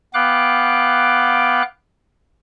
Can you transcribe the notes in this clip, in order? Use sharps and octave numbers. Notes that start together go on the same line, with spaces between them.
B3 F5 G5 D6 F#6